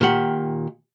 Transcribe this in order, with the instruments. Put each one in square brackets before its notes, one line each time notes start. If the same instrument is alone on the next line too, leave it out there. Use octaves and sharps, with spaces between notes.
[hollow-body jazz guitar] A#2 D#3 G4 F#5